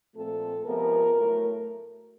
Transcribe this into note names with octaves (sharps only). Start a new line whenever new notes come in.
A#2 F3 A3 C4 A4
C3 F3 G#3 B3 A#4
A2 F#3 A3